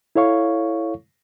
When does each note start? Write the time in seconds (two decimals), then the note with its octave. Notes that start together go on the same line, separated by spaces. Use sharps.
0.16 E4 A4 C#5 F5 C#6